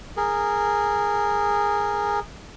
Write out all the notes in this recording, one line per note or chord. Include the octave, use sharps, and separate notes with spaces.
G#4 A#4